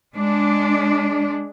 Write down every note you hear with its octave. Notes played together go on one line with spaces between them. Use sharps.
G#3 D4